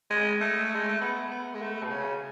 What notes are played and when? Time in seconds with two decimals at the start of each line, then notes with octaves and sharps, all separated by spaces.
0.10 G#3
0.40 A3
0.75 G#3
0.88 A3
1.01 B3
1.31 B3
1.54 G#3
1.62 A3
1.83 B2
1.91 C#3